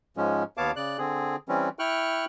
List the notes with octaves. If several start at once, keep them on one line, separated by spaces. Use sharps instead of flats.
G#2 F3 G#3 C#4
D#2 B3 C#5 F5 A5 D6
C#3 D5 F#6
D3 C4 G#4
E3 G3 C4 C#4
E4 G5 C#6 F6 F#6